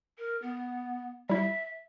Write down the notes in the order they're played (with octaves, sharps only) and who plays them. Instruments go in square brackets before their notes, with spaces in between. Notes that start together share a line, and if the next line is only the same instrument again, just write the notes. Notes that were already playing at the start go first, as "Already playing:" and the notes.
[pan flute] A#4
B3
[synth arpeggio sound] G3 E4 [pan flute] E5